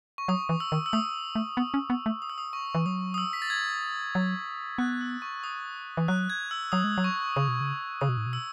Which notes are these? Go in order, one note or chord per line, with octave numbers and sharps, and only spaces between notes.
C#6
F#3 D#6
E3
E6
D#3
E6
A3 D#6
A3
B3
C#4
B3
A3
D#6
E6
D#6
C#6
E3
F#3 D#6
D#6
E6
B6
A6
G#6
F#3
B3 F#6
E6
C#6
D#6
E3
F#3 F#6
G#6
E6
F#3 D#6
G#3
F#3
C#6
C#3 C#6
B2
C#3
C#3 D#6
B2
A2
B2
E6